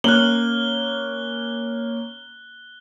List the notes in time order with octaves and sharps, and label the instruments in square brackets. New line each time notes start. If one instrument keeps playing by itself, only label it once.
[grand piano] A#3 C#4 F#7 [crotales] F#6 G7